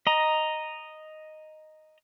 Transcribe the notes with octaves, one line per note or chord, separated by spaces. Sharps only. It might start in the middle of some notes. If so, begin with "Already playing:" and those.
D#5 A#5